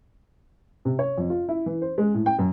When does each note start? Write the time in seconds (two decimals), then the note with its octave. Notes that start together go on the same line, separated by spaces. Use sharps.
0.85 C3
0.99 C#5
1.18 F2
1.30 F4
1.49 E4
1.66 E3
1.82 C5
1.98 G#3
2.14 A2
2.26 G5
2.39 F#2